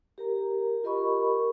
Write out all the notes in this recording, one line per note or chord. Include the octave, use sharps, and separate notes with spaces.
G4 A#4 A#5
F4 G4 A#4 D#5 B5 C#6